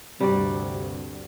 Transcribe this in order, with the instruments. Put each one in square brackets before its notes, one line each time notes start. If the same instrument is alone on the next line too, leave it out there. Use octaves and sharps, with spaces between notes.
[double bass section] D2 G2 [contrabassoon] C3 [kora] G3 F#4 D5